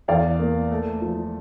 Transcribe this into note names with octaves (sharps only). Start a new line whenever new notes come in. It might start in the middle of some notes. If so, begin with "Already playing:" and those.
E2 D5 F5
A#3
A3
F3